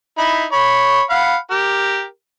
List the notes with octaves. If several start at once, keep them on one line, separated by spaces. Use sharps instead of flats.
D#4 E4 B5
C#5 B5
F5 F#5 B5
G4 A#4